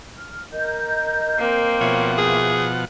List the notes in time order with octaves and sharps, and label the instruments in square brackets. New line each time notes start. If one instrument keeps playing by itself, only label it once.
[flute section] F6
A#4 D#5 G6
[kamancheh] A#3 C4
[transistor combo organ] B2 F3 F#5 [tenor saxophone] C#5 [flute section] E5
[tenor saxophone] G#4